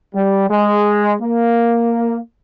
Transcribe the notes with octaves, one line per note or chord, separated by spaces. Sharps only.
G3
G#3
A#3